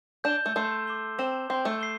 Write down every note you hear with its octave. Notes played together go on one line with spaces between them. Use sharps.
D4 G6 E7 G7
A3
A3 A5 C6 E6 C7 G7
D6 C7 G7
C4 D6 G6 E7 G7
C4 G6 C7 G7
A3
C7 G7